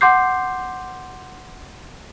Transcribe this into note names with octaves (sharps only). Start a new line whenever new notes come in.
F#5 C6 D6 G6 C7